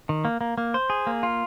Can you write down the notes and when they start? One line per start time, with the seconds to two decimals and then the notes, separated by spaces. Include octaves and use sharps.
0.09 D#3
0.25 A#3
0.41 A#3
0.58 A#3
0.74 C5
0.90 G#4
1.07 A#3
1.23 F4